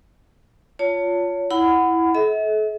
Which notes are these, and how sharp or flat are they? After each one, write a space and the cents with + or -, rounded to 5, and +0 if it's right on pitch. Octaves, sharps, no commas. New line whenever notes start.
F4 +0 C#5 +25 A5 +25
E4 +0 F#5 +0 B5 +25
A4 -40 E5 -45